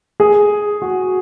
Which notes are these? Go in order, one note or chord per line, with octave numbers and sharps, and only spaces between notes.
G#4
F#4